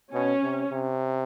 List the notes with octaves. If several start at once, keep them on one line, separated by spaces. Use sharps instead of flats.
B2 C#4
C3
C3